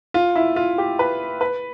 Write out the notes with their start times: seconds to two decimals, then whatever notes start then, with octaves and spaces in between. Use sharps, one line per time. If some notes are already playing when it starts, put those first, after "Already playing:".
0.14 F4
0.36 E4
0.56 F4
0.78 G4
0.99 B4
1.41 B4